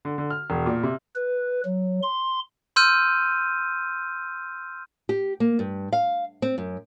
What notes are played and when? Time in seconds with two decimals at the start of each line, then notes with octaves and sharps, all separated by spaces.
0.05 D3
0.18 D3
0.30 F6
0.50 E1
0.66 A#2
0.83 C3
1.15 B4
1.65 F#3
2.02 C6
2.76 C6 E6 F6 G6 D#7
5.09 G4
5.40 A#3
5.59 G2
5.93 F5
6.42 C4
6.58 F#2